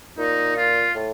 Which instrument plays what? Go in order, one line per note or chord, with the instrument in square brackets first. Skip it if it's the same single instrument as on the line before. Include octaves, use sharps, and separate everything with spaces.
[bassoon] A#2 [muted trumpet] D#4
[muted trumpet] F4
[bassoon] A2